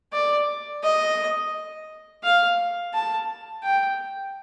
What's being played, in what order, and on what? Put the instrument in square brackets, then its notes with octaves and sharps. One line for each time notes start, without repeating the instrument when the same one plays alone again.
[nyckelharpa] D5
D#5
F5
A5
G5